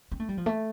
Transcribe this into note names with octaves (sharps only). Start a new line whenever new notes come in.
C4
A3
G3
F3
A3